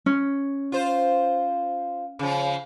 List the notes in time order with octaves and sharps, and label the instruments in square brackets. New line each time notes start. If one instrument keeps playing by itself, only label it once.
[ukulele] C#4
[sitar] F4 C5
C#3 F3